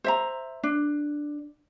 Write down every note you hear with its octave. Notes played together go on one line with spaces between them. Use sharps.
C5 E5 A#5
D4